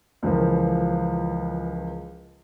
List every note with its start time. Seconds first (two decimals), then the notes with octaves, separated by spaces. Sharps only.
0.23 C#2 E3 F3 A#4